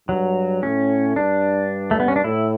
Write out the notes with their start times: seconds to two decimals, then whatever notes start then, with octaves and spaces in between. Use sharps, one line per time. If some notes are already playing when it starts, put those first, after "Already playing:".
0.09 G2 F#3
0.63 A2 C#4
1.16 G2 D4
1.91 A3
2.00 B3
2.08 C#4
2.16 D4
2.24 A2 E4